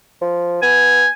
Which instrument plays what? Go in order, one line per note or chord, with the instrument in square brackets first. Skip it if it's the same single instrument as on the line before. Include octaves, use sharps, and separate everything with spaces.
[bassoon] F3
[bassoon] B3 [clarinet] G#5